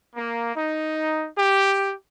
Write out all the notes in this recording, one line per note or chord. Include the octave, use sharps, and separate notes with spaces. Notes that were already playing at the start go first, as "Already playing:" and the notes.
A#3
D#4
G4